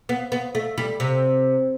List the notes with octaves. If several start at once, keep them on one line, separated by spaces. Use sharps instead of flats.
B3
B3
A3
G3
C3